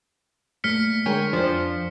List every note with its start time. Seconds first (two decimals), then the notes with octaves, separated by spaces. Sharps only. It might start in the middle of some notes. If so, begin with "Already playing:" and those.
0.64 A#2 A3 F6 B6 C#7
1.06 D3 G#3 A#4 C#5 G5 G#5
1.33 F2 F3 D4 C5 D5